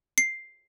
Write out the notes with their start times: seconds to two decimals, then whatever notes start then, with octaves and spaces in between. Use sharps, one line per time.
0.18 C7